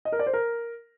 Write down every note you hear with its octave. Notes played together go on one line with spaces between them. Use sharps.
D#5
A#4
D5
C5
A#4